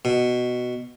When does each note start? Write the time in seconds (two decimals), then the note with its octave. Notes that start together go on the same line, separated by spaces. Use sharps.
0.05 B2